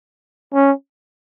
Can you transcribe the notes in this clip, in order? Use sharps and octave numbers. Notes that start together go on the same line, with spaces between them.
C#4